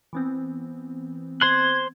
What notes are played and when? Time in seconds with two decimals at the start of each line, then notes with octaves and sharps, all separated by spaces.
0.13 E3 B3 C4
1.41 C5 C6 F#6 G#6